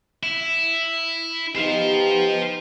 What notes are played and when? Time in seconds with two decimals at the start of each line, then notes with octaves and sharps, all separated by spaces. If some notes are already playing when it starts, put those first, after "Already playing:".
0.23 E4
1.56 B3 D#4 G4 C5 F5